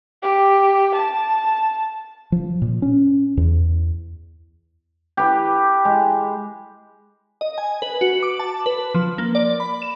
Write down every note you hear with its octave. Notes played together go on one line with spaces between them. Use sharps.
G4
A5
F3
A#2
C#4
E2
G4 B4
G#3
D#5
G#5
B4
F#4
D6
A5
B4
F3
A#3
D5
B5
E7